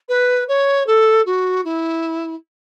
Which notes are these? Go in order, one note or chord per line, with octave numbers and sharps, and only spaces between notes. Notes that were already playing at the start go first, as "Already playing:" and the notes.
B4
C#5
A4
F#4
E4